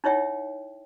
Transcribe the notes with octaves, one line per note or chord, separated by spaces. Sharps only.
D#4 E4 C#5 E5 G5